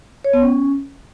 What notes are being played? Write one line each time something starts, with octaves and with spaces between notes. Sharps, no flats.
C#5
B3
C#4